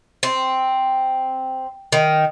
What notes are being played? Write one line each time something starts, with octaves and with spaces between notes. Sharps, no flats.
C4
D#3